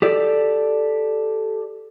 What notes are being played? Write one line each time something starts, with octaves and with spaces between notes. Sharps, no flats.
G4 A4 D5